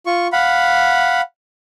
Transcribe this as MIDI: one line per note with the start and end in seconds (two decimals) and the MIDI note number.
0.06 0.27 65
0.06 0.27 85
0.32 1.21 77
0.32 1.21 78
0.32 1.21 83